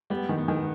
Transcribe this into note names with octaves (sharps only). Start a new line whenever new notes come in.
G3 B3
D#3
B3
D#3